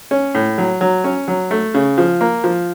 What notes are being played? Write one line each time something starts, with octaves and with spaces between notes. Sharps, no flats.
C#4
A2
F#3
F#3
C#4
F#3
A3
C#3
F3
A#3
F3